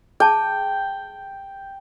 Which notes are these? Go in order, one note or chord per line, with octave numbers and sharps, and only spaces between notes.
G#4 G5 A5